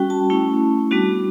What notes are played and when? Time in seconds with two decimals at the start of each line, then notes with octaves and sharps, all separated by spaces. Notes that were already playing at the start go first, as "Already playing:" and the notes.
Already playing: G3 C#4 F#4 G5
0.10 A5
0.30 A3 C#4 E4
0.91 G3 B3 D4 F#4